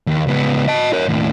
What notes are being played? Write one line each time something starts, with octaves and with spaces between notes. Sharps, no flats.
D#2
C#2 B3
D#5 A5
A#4 C#5
D#2 A2